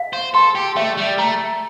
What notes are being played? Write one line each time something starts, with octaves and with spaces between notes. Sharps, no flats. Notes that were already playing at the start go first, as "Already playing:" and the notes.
Already playing: F5
C5
A4 C6
G4
A3 E5
G3
A3 A#5